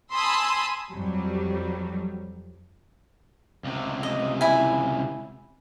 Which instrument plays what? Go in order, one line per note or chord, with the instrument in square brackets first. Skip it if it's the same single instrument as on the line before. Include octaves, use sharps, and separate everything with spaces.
[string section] G#5 A5 B5 C6 D#6 E6
F2 F#3 G3
[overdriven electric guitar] C#2 C3
[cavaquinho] D#5
E4 G#5